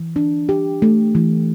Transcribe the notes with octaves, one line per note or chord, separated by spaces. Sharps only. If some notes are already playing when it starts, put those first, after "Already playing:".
Already playing: E3
D4
G4
A3
E3